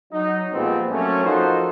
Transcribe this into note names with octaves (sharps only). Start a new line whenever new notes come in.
F#3 D#4
A#2 F3 G3 G#3 B3 C4
F#3 A3 A#3 C4 C#4
F3 D#4 F#4 A4 A#4 C5